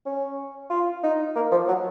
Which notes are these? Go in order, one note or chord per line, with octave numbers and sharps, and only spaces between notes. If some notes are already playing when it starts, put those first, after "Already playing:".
C#4
F4
D#4
A#3
F3
F#3